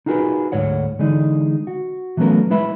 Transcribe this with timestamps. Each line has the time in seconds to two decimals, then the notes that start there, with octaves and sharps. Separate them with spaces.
0.06 D#4 F4 F#4 G#4 A#4 B4
0.52 D2 G#2 C#5 F#5
0.99 D3 E3 G#3 D#4
1.67 F#4
2.17 E3 F#3 A3 B3 C#4 A#4
2.50 G#3 E4 B4 E5 B5